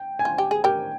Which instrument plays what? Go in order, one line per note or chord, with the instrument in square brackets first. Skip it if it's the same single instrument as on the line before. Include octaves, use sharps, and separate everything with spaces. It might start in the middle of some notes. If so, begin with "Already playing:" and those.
Already playing: [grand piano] G5
G#5
[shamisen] F4
G4
G#4
[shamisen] G4 A#4 [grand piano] G5